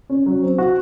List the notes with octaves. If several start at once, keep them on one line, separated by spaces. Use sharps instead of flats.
C#4
F#3
C4
F#4